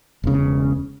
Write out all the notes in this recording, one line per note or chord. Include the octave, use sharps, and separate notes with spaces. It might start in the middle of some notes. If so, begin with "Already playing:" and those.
E1 C#3